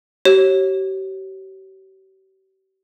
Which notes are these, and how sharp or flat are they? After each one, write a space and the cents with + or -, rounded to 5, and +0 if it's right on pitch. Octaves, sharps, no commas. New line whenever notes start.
G4 -40 C#5 -25